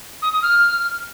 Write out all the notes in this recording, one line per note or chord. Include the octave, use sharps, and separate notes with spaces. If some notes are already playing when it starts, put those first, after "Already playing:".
D#6
D#6
F6